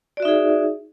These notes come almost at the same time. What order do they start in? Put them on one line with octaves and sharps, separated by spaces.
D5 F#4 E5 D#4 G#4